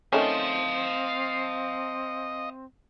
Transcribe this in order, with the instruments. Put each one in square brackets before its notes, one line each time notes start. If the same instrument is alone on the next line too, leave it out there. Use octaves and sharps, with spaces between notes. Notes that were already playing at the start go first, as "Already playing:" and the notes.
[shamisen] D#3 A3 C#4 [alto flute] C4 [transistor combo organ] D#5 [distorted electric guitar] F5 A5